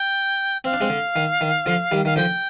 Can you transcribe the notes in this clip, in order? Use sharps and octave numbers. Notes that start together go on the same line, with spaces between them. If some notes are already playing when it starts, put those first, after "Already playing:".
Already playing: G5
C4 F5
D4
G#3 C4
D3
D#3
D#3
D3 F3
D#3 G3
D#3 F5
D3 F3 G5